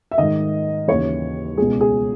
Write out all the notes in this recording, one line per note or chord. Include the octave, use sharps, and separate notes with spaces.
E5
G#2 D#3 D#5
D#2 C#3 E3 C#5
C#2 B2 G#4
G#4